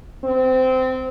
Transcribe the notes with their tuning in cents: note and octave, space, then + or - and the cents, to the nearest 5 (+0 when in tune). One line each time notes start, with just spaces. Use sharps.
C4 -20